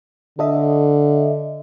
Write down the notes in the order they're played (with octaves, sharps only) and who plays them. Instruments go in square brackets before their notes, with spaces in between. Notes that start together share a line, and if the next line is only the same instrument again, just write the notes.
[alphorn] D3 [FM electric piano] A4 D#5 E5